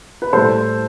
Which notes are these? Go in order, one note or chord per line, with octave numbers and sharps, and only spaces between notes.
B4
A2 G3 A4 C5